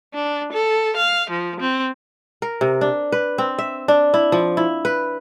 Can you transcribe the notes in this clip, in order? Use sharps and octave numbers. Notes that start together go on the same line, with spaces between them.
D4
A4
F5
F3
C4
A#4
C3
D4
B4
C4
E5
D4
E4
F3
E4
B4